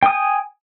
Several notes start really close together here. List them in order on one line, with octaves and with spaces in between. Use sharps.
G5 D#6 G#5